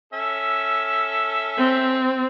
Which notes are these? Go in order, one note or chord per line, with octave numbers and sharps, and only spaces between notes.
C#4 A4 E5
C4